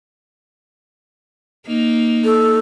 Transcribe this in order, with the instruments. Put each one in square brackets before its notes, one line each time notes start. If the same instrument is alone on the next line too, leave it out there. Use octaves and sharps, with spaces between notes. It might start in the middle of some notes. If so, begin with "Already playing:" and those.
[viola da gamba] A#3 D#4
[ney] A4